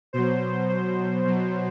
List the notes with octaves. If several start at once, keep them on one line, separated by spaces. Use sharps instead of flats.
B2 F#3 C5
C5
B2 F#3